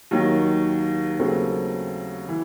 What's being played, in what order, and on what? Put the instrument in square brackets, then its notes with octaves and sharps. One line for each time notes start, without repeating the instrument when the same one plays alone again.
[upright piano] D#2 D#3 F#3
D#2 C#3 F#3 A3 C4
E3